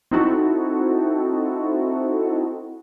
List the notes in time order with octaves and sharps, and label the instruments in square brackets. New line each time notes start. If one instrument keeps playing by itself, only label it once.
[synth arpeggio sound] C4 D#4 E4 F#4 A4